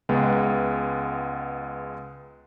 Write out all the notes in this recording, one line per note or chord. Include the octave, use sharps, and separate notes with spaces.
C#2 G#3 B3